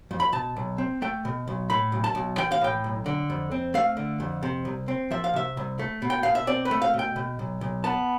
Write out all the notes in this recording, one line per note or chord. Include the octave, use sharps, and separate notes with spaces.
F2
B5
B2 A5
B1
C4
A3 G5
B2
B1
A2 B5
B1
A5
B1
E3 G5
F5
A2 G5
B1
D3
F2
C4
A3 F5
D3
F2
C3
C2
C4
F3 E5
F5
C3 E5
C2
A3
B2
G5
B2 F5
E5
C4 D5
B4
A3
F5
B2
G5
B2
B1
B1
B3 A5